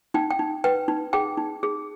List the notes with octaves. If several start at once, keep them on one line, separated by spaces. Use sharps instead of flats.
D#4 G5
G5
D#4
B4 G5
D#4
G#4 G5
D#4
G#4